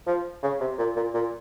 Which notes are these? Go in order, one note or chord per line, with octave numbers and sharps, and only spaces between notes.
F3
C#3
C3
A#2
A#2
A#2